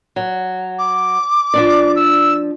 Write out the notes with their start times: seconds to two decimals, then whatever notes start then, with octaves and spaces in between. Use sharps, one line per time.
0.16 F#3
0.79 D6
1.54 F3 D4 D5
1.96 E6